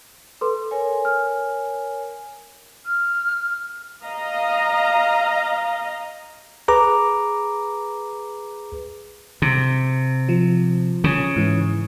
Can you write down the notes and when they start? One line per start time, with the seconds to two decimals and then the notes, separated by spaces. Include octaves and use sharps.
0.41 A4 B4 C6
0.71 A#4 C#5 G#5
1.05 F6
2.85 F6
4.03 D#5 F5 A#5
6.68 G#4 B4 A#5 D6
9.42 C3
10.29 F3
11.04 C#3
11.36 G#2 E3